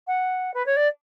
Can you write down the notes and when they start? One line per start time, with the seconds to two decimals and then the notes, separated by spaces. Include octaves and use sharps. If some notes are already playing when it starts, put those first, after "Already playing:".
0.07 F#5
0.54 B4
0.66 C#5
0.77 D5